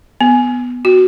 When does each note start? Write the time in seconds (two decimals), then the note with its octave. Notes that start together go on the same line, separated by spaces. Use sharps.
0.21 B3
0.85 F#4